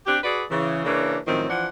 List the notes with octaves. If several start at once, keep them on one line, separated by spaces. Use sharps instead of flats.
C4 D4 G4
F#4 G#4 B4 D5
C#3 E3
C#3 E3 A#3 C#4 D4
F#2 A2 D#3 F3 C4
E3 F3 D4 F#5